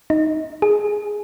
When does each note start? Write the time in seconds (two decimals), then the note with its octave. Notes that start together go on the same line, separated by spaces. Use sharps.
0.10 D#4
0.62 G#4